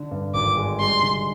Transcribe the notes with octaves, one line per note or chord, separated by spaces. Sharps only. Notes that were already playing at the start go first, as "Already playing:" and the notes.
Already playing: D3
G2
G#1 D6
G#3
G3 C6
D3